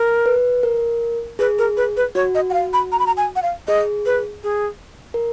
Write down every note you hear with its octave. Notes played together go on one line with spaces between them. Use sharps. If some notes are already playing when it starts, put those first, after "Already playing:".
Already playing: A#4
B4
A#4
G#4 B4
A#4
B4
B4
F#4 C#5
D#5
F#5
F5
B5
A#5
B5
A#5
G#5
F#5
F5
G#4 D#5
B4
G#4
A#4